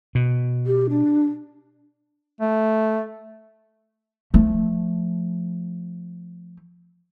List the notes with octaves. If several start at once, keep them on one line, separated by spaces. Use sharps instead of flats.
B2
G4
D4
A3
F3 A3